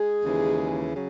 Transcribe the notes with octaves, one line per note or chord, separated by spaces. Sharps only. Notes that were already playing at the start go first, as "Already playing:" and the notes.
Already playing: G#3 G#4
D#2 C#3 E3
C#3 F#3